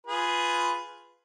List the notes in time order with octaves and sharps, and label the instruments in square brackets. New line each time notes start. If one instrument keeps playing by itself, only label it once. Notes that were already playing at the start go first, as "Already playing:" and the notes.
[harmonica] F4 G#4 B4